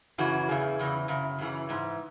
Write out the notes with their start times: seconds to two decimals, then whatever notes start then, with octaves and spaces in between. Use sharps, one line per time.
0.18 F#2 C#3 E3 F#4
0.49 E2 C#3 E3 G#4
0.79 E2 C#3 E3
1.08 F#2 C#3
1.39 F#2 C#3 E3
1.69 G#2 E3